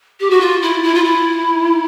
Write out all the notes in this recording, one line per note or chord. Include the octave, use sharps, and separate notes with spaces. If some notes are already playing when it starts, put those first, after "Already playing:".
G4
F#4
F4
E4
E4
F4
E4